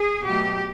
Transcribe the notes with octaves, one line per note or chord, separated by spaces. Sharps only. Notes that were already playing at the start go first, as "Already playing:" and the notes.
Already playing: G#4
B2 F#3 A3 G4